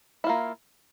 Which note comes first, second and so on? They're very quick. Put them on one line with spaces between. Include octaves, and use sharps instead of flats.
E4 F4 A#3